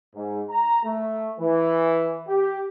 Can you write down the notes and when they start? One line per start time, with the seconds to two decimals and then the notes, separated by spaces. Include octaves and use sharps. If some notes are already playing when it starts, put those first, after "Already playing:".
0.15 G#2
0.50 A#5
0.83 A3
1.38 E3
2.27 G4